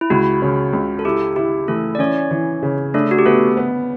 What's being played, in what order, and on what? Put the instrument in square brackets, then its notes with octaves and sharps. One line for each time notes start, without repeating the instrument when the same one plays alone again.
[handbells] E4
[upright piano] C#2 [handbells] F#4
[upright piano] C#3
C#2
[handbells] A4
[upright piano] E4 [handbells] G4
[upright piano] E4 [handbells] G4
[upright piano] E3 [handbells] A3 A4
[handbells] D5
[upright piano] E3 [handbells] C#4 C#5
[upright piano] E3
C#3
[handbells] A3 A4 [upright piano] D4
[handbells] F#4
G4
[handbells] A3 A4 [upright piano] B3
[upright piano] B3